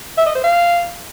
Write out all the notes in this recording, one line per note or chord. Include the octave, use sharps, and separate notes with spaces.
E5
D#5
C5
F5